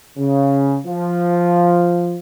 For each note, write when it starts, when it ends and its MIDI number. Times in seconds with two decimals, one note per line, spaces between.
0.18 0.78 49
0.86 2.19 53